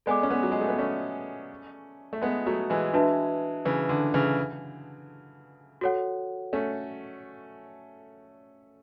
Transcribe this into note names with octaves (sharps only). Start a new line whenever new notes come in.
G#3 B3 A4 D5 G#5 D6
C#4
G#3 B3
F#3
G#3
A3
B3
A3 C#4
A3
G#3 B3
F#3 A3
E3 G#3
D4 F#4 B4 E5 A5
C#3 E3
D3
C#3 E3
F#4 A4 C#5 F#5
A3 C#4